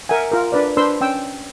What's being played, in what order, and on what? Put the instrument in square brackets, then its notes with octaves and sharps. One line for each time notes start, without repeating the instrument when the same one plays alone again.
[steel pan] A#4 E5 F#5 G#5
F4 A#4
D4 B4 D5
D4 B4 C5 C6 E6
C#4 G5 E6